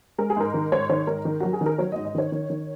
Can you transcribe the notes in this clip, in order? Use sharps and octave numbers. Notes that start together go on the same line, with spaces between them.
G#3 A#4
G#4
G#2 A#4
D#3
G#2 C#5
D#3 C#5
G#2 A#4
D#3
F#3 F#4
G#4
D#3
A#4
F#3 C#5
G#2 D#5
D#5
D#3 C#5
D#3
D#3